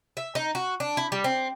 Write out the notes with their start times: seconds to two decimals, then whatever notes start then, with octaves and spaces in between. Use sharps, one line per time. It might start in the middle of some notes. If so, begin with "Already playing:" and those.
0.17 E5
0.35 D#4
0.55 F#4
0.80 D4
0.97 E4
1.12 G3
1.24 C4